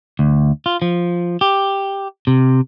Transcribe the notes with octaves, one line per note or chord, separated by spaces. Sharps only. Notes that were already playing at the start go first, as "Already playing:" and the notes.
D2
F4
F3
G4
C3